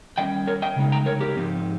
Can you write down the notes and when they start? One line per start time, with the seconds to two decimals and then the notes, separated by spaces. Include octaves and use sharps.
0.18 D#3 G3 C#4 D#5 G5
0.47 A#4 C#5
0.62 D#5 G5
0.76 C#3 G#3 D#4
0.92 G5 A#5
1.06 A#4 C#5
1.21 G4 A#4
1.36 G#2 F3 C4 D#4